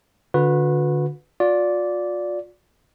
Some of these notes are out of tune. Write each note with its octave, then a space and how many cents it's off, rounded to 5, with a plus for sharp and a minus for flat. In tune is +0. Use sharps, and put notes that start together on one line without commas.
D3 +0 F#4 -35 B4 +0
F4 +40 D5 -10